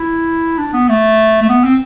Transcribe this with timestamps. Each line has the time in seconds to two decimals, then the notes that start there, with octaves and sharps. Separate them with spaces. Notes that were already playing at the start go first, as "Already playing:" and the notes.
Already playing: E4
0.58 D4
0.73 B3
0.89 A3
1.42 A3
1.49 B3
1.64 C4